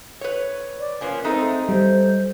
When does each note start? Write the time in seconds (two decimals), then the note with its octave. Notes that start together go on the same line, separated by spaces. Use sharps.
0.21 B4 C#5
0.79 D5
1.01 F3 A#3 C#4 B4
1.24 G#3 A3 C4 D#4
1.69 G3 C5